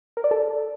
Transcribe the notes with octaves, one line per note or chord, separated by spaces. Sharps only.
A#4
D5
A4